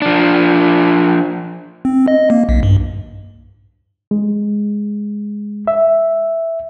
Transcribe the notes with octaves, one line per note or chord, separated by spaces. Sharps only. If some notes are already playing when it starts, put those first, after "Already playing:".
F3 D4
C4
D#5
A#3
B1
G2
G#3
E5